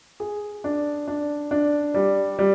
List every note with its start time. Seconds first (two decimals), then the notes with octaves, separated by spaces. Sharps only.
0.20 G#4
0.64 D4
1.08 D4
1.51 D4
1.94 G3
2.39 G3